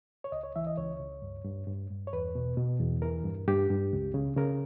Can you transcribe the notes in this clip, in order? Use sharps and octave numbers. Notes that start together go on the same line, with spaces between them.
C#5
C#2 D#5
C#5
E3 E5
D#5
C#2 C#5
C#2
G2
G2
G2
G2
C#5
E2 B4
B2
B2
E2
E3 A#4
G2
G2 G4
G2
C#2
C#3
C#3 A#4